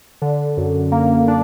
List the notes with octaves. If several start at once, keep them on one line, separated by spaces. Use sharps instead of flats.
D3
F#2
A#3
D4